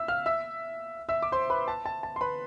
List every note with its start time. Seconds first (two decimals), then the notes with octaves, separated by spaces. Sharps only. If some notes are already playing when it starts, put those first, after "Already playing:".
Already playing: E5 E6
0.08 F5 F6
0.26 E5 E6
1.09 E5 E6
1.23 D6
1.32 C5 C6
1.50 B4 B5
1.68 A5
1.86 A5
2.03 A5
2.16 C6
2.21 B4 B5